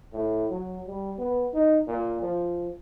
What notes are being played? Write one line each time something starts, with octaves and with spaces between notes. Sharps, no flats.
A2
F#3
G3
B3
D#4
A#2
F3